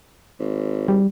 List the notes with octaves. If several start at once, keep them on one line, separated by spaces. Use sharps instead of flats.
G#1
G3